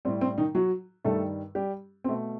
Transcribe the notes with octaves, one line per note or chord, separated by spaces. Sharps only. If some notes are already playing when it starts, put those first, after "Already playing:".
A2 G3 C4
C4
D#3 D#4
F#3 F#4
G2 D#3 G3 A3 A4
G3 G4
B2 A3 C4